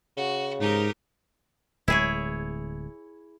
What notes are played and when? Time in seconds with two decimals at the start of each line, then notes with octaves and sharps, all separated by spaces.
0.17 C#3 F#4
0.61 G#2 D#4 G4 A#4
1.88 D1 G#3 E4 G#4 C#5